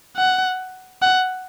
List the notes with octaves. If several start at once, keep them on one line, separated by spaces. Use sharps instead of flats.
F#5
F#5